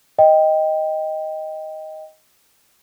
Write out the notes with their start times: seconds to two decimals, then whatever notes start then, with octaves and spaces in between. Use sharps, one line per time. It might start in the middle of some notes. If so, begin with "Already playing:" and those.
0.19 D#5 G5